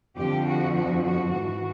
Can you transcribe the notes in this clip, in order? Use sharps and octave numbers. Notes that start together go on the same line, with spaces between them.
F2 D3 F3 G4
F#4
F#4
F#4
G#2 E3 F#4